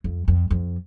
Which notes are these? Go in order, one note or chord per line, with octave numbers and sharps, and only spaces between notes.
F2
F2
F2